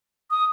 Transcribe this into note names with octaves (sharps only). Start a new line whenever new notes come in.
D#6